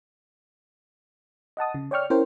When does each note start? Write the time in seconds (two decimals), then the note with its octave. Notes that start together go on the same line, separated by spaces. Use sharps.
1.57 D#5 F#5 A5 D#6
1.75 C#3
1.91 C#5 D5 G5 C#6 F6
2.10 C#4 E4 A#4 C5 C#5 G5